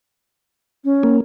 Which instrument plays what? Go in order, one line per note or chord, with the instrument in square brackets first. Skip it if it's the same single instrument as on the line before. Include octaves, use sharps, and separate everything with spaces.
[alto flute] C#4
[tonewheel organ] A#3